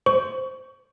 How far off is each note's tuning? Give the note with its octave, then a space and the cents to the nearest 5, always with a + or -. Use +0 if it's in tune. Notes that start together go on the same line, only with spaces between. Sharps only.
C5 +0 C#6 +25